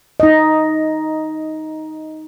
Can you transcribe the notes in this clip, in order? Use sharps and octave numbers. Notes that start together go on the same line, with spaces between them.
D#4 D#5